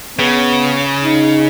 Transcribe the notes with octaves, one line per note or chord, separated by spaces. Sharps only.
C#3 B3
D#4